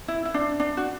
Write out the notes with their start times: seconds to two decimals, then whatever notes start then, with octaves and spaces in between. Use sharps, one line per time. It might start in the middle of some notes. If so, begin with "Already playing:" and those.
0.08 E4
0.25 E4
0.34 D4
0.60 D4
0.77 F#4